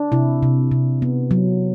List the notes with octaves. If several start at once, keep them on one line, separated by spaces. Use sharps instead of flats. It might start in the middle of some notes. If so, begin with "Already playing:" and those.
Already playing: D4
C3 E4
C3
C3
B3
F#3